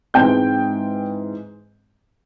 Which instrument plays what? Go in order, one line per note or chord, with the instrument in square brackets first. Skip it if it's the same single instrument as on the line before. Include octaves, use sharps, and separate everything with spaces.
[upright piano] G#2 E3 G#3 C4 G5 G6